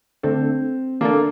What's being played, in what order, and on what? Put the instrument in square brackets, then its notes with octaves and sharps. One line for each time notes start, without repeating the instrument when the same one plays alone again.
[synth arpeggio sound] D3 A3 D4 A4 [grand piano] C4
[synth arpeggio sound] D3 A3 D4 A4 [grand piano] A#3